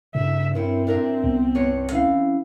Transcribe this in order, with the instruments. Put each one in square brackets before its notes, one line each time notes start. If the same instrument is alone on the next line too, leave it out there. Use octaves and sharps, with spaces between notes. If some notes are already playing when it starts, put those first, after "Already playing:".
[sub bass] G2 [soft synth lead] C#3 [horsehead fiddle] E5
[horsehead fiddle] C4 [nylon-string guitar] C#4 E4 [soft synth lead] A#4
[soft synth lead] G#2 [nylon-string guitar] D4 A#4 E5
[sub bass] C2 [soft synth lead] B3
[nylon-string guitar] G2 C#4 C#5
[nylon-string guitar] E3 F5 [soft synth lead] C#4